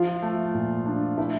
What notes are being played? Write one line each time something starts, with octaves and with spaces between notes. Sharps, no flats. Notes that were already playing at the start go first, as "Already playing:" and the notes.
Already playing: F3 F4
A3
A#2
D4
A3 E4